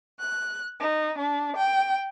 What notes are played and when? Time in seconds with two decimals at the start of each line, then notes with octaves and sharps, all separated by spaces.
0.20 F#6
0.80 D#4
1.18 D4
1.56 G5